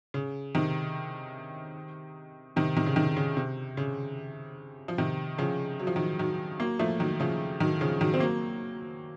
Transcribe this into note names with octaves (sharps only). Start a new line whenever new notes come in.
C#3
C3 D#3
C3 D#3
C3 D#3
C#3
C3 D#3
C#3
C3
C#3
F3
C3 D#3
C#3 F3
F#3
F3
D#3 F#3
D#3 F#3
F#3 A#3
F3 A3
D#3 F#3
C#3 F3
D#3 F#3
C#3 F3
D#3 F#3
C4
F#3 A#3